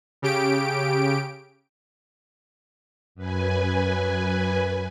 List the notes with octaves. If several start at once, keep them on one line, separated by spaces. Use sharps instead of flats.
C#3 G4 D7
F#2 B4 G#5